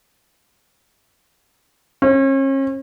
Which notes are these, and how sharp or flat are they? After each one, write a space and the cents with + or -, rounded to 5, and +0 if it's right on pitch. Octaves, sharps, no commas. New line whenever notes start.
C#4 -40